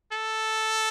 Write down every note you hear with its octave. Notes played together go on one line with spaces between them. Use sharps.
A4